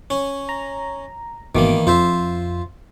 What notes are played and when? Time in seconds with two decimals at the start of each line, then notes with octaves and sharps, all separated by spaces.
0.10 C#4
0.49 A#5
1.55 G#1 B2 D#3 E3 A#3 D6
1.87 F2 F4 C5 E5